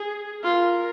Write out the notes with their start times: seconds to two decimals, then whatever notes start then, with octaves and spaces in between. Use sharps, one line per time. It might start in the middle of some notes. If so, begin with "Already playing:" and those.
Already playing: G#4
0.44 F4 A#4